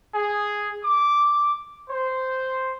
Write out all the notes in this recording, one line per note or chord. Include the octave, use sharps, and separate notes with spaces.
G#4
D6
C5